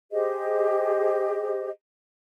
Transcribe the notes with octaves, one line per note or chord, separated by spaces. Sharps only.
G4 G#4 C5 D#5